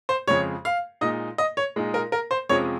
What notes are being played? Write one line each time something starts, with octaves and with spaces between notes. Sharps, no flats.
C5
F2 C#3 G#3 C#5
F5
A#2 G#3 D#4 D#5
D#5
C#5
A#2 G#3 D#4
A#4
A#4
C5
F2 C3 F3 G#3 C#4 C#5